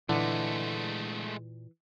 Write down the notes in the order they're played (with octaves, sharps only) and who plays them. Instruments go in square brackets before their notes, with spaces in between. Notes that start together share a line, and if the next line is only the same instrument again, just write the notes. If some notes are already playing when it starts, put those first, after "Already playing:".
[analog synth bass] A#2 [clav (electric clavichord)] D3 [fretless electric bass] E3 [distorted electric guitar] G#3 A3